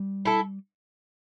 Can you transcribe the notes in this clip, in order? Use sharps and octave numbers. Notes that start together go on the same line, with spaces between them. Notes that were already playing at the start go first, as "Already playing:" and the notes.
Already playing: G3
E4 A4